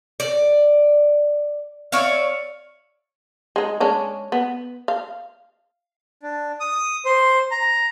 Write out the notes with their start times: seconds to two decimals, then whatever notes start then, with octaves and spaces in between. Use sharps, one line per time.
0.20 D5
1.92 C#5 D5 E5 F5
3.56 G#3 D#4
3.80 G#3 C#4 D4
4.32 B3
4.88 F5
6.23 D4
6.60 D#6
7.05 C5
7.51 A#5